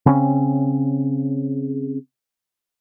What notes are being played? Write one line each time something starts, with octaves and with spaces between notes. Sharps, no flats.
C#3 C4 C#4